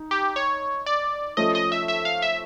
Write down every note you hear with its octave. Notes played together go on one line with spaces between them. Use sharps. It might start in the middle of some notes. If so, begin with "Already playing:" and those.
Already playing: D#4
G4
C#5
D5
F3 A3 C#4 D#5
D#5
E5
E5
F5
E5